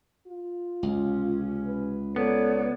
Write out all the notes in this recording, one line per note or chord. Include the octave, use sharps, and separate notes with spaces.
F4
C#2 C3 C#4
B4
B3 A4 A#4 C#5 D5